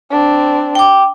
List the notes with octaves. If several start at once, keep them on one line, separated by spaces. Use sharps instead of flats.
C4 D4
G5 D6